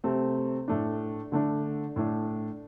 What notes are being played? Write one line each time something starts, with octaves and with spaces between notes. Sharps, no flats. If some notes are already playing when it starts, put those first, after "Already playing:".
C3 A3 C4
A2 A3 D4
D3 A3 D4
A2 A3 D4